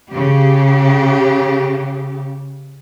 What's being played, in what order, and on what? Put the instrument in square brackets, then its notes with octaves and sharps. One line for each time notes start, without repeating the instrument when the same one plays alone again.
[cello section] C#3 G4